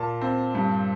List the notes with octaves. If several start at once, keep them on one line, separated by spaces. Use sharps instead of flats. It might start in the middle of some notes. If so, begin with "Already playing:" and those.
Already playing: A#2 A5
C4
G2